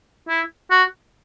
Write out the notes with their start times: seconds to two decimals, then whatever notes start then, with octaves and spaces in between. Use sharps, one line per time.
0.28 E4
0.71 F#4